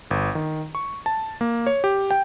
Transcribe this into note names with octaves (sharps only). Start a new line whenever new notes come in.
G1
D#3
C#6
A5
A#3
C#5
G4
G5